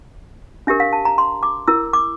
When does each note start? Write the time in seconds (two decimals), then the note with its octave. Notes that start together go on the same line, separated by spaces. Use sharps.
0.67 D4 G4 A#4 E5
0.80 F5
0.93 A5
1.05 A#5
1.18 C6
1.43 D6
1.68 E4 A#4 E6
1.93 D6